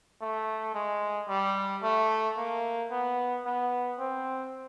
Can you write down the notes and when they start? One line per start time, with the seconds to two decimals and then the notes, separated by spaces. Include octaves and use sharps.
0.21 A3
0.74 G#3
1.28 G3
1.83 A3
2.37 A#3
2.91 B3
3.45 B3
3.99 C4